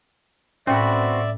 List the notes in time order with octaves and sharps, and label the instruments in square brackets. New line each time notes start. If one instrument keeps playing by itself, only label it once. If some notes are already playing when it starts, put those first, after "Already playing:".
[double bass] A2 [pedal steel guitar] C4 F#4 B4 [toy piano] C#4 [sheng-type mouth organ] D5 E5